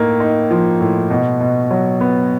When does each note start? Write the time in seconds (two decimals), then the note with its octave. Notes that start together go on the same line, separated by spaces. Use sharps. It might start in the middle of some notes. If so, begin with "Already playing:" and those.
Already playing: A2 A#3 D#4
0.20 D#4
0.51 F3
0.80 A2
1.10 B2
1.40 B2
1.71 F#3
2.01 B3